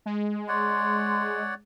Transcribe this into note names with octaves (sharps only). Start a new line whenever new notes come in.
G#3
C#5 D5 F#5 C6